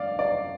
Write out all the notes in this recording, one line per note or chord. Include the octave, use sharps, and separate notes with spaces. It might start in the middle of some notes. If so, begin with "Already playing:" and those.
Already playing: D5 F5
D5